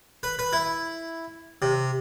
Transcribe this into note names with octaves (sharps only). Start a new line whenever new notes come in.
B4
B4
E4
C3